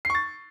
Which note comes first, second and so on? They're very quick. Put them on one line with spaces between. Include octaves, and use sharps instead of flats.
C7 C#6 A6